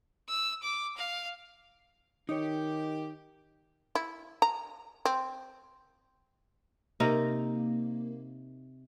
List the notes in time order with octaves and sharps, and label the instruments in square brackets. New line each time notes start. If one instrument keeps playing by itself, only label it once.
[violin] E6
D6
F5
[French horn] D#3 [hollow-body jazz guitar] D#4 C#5 [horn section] G4
[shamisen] E4
A#5
C4
[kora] C3 D#4 A#4 [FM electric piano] A#3